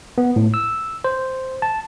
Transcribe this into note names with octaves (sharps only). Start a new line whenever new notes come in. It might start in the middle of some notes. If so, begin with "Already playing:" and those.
B3
A2
E6
C5
A5